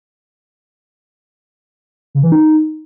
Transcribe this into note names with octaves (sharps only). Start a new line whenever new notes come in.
C#3
E3
D#4